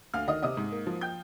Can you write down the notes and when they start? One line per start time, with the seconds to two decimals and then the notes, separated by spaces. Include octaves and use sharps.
0.14 D2 F5 F6
0.28 D#3 D#5 D#6
0.42 C3 D#5 D#6
0.57 G#2
0.72 A#3
0.87 F3
1.01 G5 G6